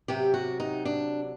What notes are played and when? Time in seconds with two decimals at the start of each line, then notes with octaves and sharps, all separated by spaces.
0.08 C3 F#3 G4
0.34 F#4
0.60 D#4
0.85 D4